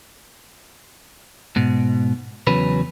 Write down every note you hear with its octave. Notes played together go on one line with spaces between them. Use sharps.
G#2 B2
E2 C#3 F#3 C#4 B4